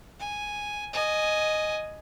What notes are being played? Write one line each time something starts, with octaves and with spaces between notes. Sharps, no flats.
G#5
D#5 G#5